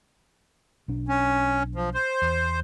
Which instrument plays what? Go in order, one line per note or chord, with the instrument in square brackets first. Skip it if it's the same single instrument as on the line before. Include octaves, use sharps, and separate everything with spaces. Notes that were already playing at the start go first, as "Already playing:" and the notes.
[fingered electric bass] B1 D4
[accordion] C#4
F3
C5
[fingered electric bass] E2